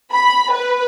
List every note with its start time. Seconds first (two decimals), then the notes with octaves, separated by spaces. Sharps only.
0.12 B5
0.52 B4